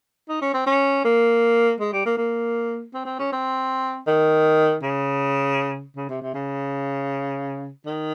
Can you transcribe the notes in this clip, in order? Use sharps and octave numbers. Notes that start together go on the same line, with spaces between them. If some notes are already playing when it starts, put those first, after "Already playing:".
D#4
C#4
C4
C#4
A#3
G#3
G3
A#3
A#3
C4
C4
C#4
C4
D#3
C#3
C#3
C3
C3
C#3
D#3